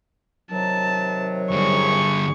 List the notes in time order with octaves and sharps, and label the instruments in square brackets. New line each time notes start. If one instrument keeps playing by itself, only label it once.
[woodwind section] C3 D#3 F#3 [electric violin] A5
[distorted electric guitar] G2 D3 [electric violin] G#4 C#6